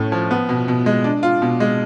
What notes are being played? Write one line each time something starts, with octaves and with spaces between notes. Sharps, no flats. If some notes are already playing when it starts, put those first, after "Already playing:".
Already playing: A2 A3 C#4
F3
B3
B2
B2
G#3
D4
F4
B2
G#3